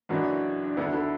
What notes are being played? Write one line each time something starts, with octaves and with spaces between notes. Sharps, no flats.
F#1 F#2 E3 D4 F#4
D4
D2 D3 B3 E4
E4 A4